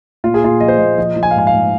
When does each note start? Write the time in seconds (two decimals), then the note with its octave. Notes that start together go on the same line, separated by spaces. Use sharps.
0.24 A#2 F4
0.34 G#4
0.42 A#2 F4
0.60 F3 D#5
0.68 C5
0.78 A#2 D#5
0.98 F3 D#5
1.16 F3
1.23 G#5
1.31 F5
1.35 G#2 G#5
1.47 F5
1.53 G#2